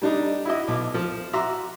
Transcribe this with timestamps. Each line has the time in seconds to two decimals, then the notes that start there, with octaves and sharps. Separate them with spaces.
0.02 G3 D4 D#4
0.45 E4 F#4 D#5
0.68 B1 D6
0.94 F3
1.33 F#4 E5 A#5 C6 D6